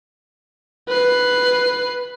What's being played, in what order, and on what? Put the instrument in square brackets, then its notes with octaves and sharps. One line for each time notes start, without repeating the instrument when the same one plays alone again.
[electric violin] B4 C7